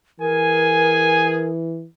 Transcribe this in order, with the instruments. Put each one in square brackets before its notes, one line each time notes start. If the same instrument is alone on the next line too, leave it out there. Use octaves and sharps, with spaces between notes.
[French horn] E3 [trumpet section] G#4 G#5 [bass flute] A#4